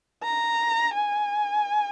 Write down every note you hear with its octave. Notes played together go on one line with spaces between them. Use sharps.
A#5
G#5